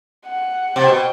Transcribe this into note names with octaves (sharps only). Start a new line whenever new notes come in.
F#5
C3 G5
B2